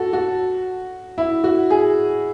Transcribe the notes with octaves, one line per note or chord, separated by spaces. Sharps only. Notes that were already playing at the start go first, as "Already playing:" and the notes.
Already playing: F#4 A4
F#4
E4
F#4
G#4